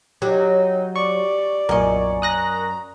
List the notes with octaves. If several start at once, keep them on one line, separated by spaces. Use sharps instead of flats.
F#3 D#4 G4
D5 C#6
B1 F#2 A#2 A#4 D#5 G#5 C#6
A#5 D#6 F#6 A#6